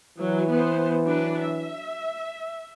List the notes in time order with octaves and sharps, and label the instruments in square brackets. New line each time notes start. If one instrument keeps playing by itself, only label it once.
[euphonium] E3 [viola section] F#3
[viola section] B3 C5
F#3 D4 B4
E5